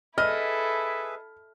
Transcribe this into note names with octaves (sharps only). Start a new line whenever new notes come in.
E4 G#4 A4 B4 D#5 E5 F6